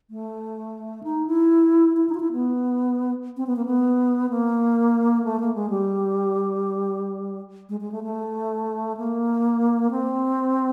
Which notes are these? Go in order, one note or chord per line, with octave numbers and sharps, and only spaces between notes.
A3
D#4
E4
E4
D#4
F4
E4
B3
C4
B3
A#3
B3
A#3
A3
A#3
G#3
G3
G#3
G#3
A3
A3
A#3
C4